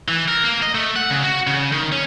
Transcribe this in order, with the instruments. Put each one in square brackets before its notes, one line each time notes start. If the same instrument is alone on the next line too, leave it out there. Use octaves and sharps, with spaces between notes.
[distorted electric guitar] E3
A#4
A#3
D#5
A3
F#5
C#3
F#4
C#3
D#3
C#4